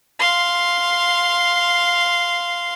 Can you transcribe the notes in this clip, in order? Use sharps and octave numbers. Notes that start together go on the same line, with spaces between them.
F5 C6